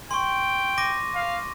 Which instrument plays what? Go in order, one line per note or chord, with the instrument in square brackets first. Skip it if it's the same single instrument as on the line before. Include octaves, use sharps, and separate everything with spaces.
[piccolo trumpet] G5 [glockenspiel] C6 C#6
[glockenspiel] D6 A#6 D#7
[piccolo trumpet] F5